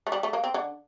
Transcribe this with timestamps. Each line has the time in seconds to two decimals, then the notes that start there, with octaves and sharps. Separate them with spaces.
0.07 A3
0.12 G3
0.23 A3
0.33 A#3
0.44 C4
0.54 D3